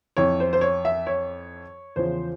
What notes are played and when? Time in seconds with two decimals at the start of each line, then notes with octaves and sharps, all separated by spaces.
0.17 F2 E3 C#5
0.40 C5
0.53 C5
0.61 C#5
0.85 E5
1.07 C#5
1.96 E2 C#3 F3 C5